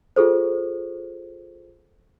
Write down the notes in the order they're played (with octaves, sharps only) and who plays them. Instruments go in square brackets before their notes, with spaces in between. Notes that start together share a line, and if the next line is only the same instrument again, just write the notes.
[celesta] F4 G#4 A4 C5